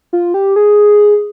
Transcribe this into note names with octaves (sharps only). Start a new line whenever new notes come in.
F4
G4
G#4